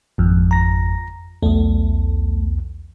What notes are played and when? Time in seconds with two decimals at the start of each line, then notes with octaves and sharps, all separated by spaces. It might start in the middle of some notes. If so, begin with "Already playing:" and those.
0.18 G#1 F2
0.51 A#5 A#6
1.43 B1 E2 A3